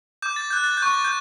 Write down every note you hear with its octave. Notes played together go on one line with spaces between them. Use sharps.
D6 G6
A6
F#6 G6
A6
G6
C#6
A6
G6